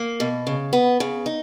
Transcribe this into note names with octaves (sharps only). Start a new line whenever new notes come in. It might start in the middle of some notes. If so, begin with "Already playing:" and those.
Already playing: A#3
B2
C#3
B3
C#3
D#4